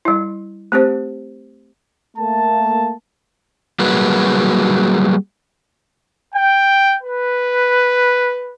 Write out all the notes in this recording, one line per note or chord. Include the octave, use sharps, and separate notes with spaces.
G3 E4
A3 C4 G4 C5
A3 A#3 A5
F#3 G3 A#3 F#4 G#4 B4
G5
B4